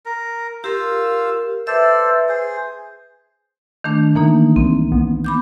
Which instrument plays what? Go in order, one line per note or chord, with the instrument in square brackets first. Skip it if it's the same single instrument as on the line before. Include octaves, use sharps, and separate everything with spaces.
[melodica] A#4
[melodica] F4 F5 E6 [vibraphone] G4 A#4
[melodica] A4 C5 D5 [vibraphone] B4 E5
[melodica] G#4 C5
[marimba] D#3 A3 D4
[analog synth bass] D#3 [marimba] E3 A#3 D#4
[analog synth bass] C2 [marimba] C4
[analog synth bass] B3
[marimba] B5 D6 G6